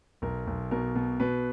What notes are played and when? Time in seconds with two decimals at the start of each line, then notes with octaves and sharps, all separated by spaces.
0.22 B1 A#4
0.47 B1
0.71 B2 A#4
0.95 B2
1.20 B2 B4